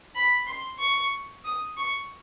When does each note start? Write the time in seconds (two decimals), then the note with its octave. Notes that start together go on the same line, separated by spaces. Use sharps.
0.15 B5
0.47 C6
0.79 C#6
1.44 D#6
1.77 C#6